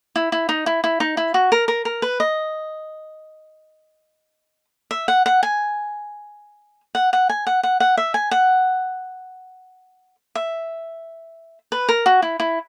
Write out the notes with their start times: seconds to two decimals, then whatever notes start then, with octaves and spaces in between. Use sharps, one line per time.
0.16 E4
0.32 E4
0.49 D#4
0.66 E4
0.84 E4
1.00 D#4
1.17 E4
1.34 F#4
1.52 A#4
1.68 A#4
1.85 A#4
2.02 B4
2.20 D#5
4.91 E5
5.08 F#5
5.26 F#5
5.43 G#5
6.95 F#5
7.13 F#5
7.29 G#5
7.47 F#5
7.63 F#5
7.80 F#5
7.97 E5
8.14 G#5
8.31 F#5
10.35 E5
11.72 B4
11.89 A#4
12.06 F#4
12.22 E4
12.40 E4